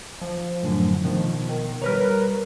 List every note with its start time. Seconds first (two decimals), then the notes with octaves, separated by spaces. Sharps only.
0.21 F3
0.63 F#2 A2 D3
1.04 B2 D#3 F3
1.49 D#3
1.82 G3 A#4 B4 C#5 A#5